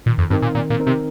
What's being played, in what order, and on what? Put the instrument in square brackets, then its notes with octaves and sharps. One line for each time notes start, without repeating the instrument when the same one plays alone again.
[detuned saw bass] A#2 [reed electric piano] D#3
[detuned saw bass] F2
[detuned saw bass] G2 [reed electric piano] C4 D#4 A#4
[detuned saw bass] A#2
[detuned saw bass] A#2 [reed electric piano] D#3
[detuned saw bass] A#2
[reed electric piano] C4 D#4 A#4
[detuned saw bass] C3